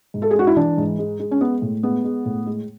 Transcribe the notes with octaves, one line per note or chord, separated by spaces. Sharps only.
G#2
A4
G#4
G#3 F#4
E4
E3 D4
G#2
G#3
G#3
C#4
G#3 B3
A2
G#3 B3
G#3
A2
G#3